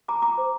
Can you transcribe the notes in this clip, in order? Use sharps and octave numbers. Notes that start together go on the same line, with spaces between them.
F4 A#5 D6
F4 A#5 D6
C5